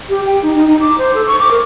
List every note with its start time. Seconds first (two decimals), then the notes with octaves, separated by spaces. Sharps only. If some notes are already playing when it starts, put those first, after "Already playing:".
0.10 G4
0.26 G5
0.42 D#4
0.56 D#4
0.68 D#4
0.81 D6
0.98 C5
1.15 A4
1.27 C#6
1.39 D6
1.51 A#4